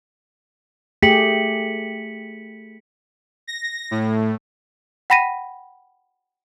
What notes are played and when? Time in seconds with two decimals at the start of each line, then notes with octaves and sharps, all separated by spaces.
1.03 A3 G4 G#4 B6 C#7 F#7
3.47 A#6
3.91 A2
5.10 F#5 G5 B5 A#6 B6 D#7